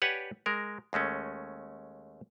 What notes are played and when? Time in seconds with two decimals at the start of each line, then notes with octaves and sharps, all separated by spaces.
0.02 G4 B4 C#5 D5 F#5 G#5
0.46 G#3 A#4
0.93 D#2 G#3 A3 C#4